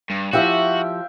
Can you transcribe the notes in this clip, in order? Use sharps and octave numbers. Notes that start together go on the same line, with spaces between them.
G2
F3 E4 F#4 G4 E5 F5 G5